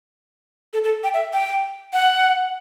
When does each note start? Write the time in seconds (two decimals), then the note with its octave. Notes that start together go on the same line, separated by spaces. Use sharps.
0.73 A4
0.84 A4
1.04 G5
1.14 E5
1.33 G5
1.93 F#5